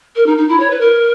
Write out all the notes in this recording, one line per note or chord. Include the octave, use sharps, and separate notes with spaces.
A#4
D#4
D#4
E4
C#5
B4
A#4